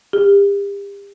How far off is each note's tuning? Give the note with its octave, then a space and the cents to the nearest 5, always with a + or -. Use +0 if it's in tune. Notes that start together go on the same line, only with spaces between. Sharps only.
G4 +35